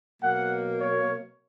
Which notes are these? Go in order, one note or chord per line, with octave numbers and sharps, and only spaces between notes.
B2 F#3 A#3 F#5
C#5